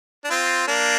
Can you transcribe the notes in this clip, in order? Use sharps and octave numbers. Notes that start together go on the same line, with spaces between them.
D4
C4 F4
A#3 D4